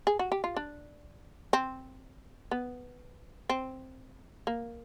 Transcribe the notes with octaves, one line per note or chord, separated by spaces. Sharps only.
G#4
F#4
G4
F4
D4
C4
B3
C4
A#3